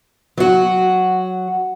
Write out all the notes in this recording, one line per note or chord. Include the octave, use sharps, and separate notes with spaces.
F#3 F#4